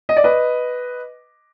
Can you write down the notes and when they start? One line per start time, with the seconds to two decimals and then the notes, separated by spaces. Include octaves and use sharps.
0.09 D#5
0.17 D5
0.24 B4 D#5